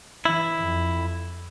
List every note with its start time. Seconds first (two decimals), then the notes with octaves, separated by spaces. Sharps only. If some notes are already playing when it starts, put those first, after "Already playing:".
0.25 E3 E4
0.63 F2